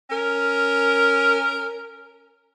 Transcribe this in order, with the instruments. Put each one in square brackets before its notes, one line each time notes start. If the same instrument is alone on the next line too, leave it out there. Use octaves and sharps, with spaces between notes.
[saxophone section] C#4 A#4